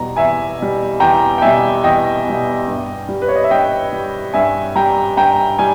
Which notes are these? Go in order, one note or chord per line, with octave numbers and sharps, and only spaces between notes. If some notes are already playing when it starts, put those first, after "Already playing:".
Already playing: E2 B2 G3 A#5
E2 E5 G#5
B2 G3
E2 G5 A#5
G5
B2 G3 E5 G#5
E2 D#5 G5
B2 G3
G2
G3
B4
C#5
D#5
E5
G2 D#5 G5
G3
G2 E5 G#5
G3 G5 A#5
G2 G5 A#5
G3 G#5